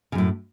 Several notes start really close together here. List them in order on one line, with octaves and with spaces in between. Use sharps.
C#3 F#2 A2